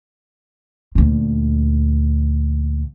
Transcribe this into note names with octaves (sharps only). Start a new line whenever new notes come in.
D2 A#2